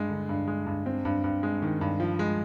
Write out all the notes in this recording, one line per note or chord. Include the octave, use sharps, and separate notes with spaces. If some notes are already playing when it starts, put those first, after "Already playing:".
Already playing: G2 G#3
D3
G2
G#3
G2
C4
G2
G2
G#3
D#3
G2
F3
G#3